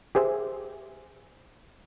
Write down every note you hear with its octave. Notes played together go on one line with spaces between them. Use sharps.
G4 G#4 C5 E5